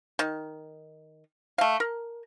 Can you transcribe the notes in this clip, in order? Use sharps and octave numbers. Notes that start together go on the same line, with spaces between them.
D#3
A3 F5
A#4